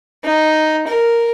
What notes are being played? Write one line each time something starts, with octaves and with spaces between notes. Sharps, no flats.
D#4
A#4